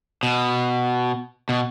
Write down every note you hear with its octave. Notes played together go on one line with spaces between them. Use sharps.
B2
B2